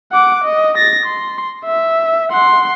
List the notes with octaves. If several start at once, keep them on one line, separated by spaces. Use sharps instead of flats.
F#5 D6
D#5
A6 A#6
C6
E5
F#5 C6